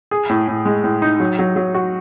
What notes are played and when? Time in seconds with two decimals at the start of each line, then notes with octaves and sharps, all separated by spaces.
0.11 G#4
0.29 A2
0.48 A2
0.65 G#3
0.84 A2
1.02 D#4
1.20 F#3
1.39 F#3
1.56 F#3
1.75 F#4